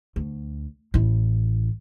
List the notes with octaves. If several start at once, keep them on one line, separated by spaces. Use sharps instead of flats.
D2
A1 E4